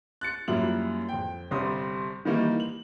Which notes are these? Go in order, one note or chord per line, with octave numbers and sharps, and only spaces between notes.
F#6 A6 C#7
F#2 G3 A#3 E4 F4 F#7
F2 G5
G1 C3 G3 C6 D#6
D#3 E3 G3 A#3 D#4
F#7